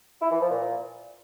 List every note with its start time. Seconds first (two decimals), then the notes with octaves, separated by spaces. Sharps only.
0.21 E4
0.31 E3
0.41 F3
0.51 A#2